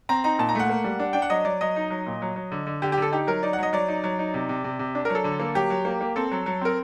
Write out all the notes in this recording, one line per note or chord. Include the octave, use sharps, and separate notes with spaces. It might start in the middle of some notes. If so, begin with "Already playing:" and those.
C4 A#5
D#4 A#5
A#2 A5
A#5
A3 F#5
A#3
G3
D4
D4 G5
F#5
F#3 D#5
F#3 D5
F#3 D#5
D#4
F#3
A#2
F#3
F#3
D3
D3
D3 G4
G4
D3 A4
D#4 G4
F#3 A#4
D#4 D5
F#5
F#3 D#5
F#3 D5
D#4
F#3
D#4
C3
C3
C3
C3
D4
A#4
F#3
A4
D3
A#3
F#3 G4
F#3
A#3
A#3
C4 A4
F#3
F#3
C4 A#4